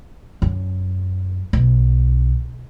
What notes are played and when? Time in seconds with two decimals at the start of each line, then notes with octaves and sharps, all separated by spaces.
0.42 F#2
1.53 B1